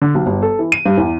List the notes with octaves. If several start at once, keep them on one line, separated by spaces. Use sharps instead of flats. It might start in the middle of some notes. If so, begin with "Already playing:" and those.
D3
B1
G1
A4
E3
D#7
G2
E2